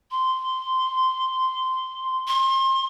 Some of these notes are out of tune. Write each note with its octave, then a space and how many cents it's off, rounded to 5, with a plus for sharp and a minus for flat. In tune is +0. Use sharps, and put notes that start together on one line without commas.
C6 -10
C6 +30